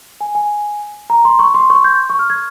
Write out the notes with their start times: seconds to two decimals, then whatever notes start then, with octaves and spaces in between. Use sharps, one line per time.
0.21 G#5
0.35 G#5
1.10 A#5
1.25 C6
1.39 C#6
1.54 C6
1.70 C#6
1.84 G6
2.10 C#6
2.19 F6
2.30 G#6